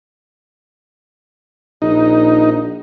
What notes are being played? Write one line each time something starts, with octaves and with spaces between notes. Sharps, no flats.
A#1 D#4